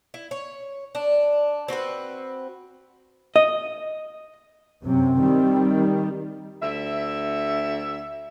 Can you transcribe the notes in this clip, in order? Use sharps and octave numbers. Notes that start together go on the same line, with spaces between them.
E4
C#5
D4
C4 F#4 G#4 B4
D#5
F#2 C3 C4
D#3 G3
D2 E5